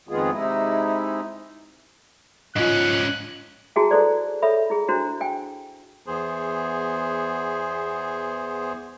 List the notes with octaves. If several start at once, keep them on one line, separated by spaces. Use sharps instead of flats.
F2 D#3 G#3 B3 F4 G#4
C3 G#3 D#4 E4
G#2 C#4 F4 D#5 F#6
E4 F#4 G#4 E5 G#5 A5
E4 F#4 A4 B4 C5 D5
A4 C#5 E5 B5
E4 G#4
D4 E4 F#4 C5
G5 G#5
E2 E3 B3 G#4 C5